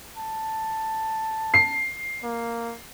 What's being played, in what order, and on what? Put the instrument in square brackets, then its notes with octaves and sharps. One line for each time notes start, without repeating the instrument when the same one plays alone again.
[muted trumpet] A5
[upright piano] C7
[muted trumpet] A#3